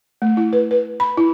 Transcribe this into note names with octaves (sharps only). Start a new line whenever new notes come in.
A3
E4
B4
B4
B5
E4